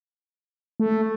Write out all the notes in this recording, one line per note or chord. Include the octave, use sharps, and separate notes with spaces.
A3